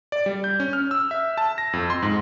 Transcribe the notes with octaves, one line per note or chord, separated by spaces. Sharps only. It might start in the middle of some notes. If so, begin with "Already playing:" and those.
D5
G3
G6
C#4
F6
E6
E5
A5
A#6
F2
C6
G#2